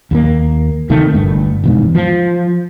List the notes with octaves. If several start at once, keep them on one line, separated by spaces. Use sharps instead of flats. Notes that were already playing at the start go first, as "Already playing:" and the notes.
D#2 G3 A#3
D2 C3 D#3 A3
G1 G2 A3
E1 E2 G#2
F3